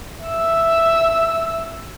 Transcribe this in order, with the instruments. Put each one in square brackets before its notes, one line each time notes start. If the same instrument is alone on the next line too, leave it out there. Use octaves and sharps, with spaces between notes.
[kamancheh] E5 E6